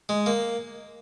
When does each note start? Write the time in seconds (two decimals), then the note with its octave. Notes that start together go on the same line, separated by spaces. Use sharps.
0.09 G#3
0.26 A#3